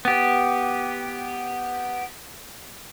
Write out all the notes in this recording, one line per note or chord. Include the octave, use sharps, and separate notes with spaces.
B3 G4